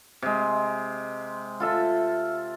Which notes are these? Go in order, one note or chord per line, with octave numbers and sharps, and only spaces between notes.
C3 G#3
F4 A4 E5